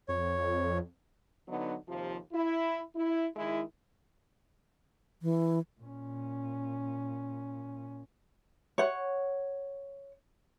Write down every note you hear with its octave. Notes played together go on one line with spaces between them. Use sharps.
F2 C#5
D3 F#3 B3 D#4
D#2 C3 F3
E4
E4
D#3 G#3 E4
E3
A#2 C#4
C#5 F#5